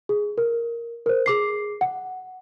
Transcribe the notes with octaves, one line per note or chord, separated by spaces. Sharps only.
G#4
A#4
A#4 C5
G#4 D6 C7
F#5